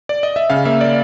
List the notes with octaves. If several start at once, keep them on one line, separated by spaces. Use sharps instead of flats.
D5
D#5
E5
C#3 F5
A#3 E5
D5